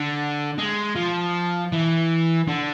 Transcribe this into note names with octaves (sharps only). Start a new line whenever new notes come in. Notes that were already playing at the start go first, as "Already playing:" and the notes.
Already playing: D3
G#3
F3
E3
D3